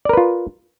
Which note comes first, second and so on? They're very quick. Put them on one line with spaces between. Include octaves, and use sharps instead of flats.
D5 A#4 B4 F4